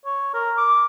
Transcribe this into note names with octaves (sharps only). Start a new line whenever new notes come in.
C#5
A#4
D6